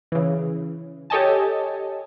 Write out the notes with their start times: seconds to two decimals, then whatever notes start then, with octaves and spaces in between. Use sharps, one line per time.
0.12 C#3 E3
1.10 G4 A4 C#5 D#5 G#5 A5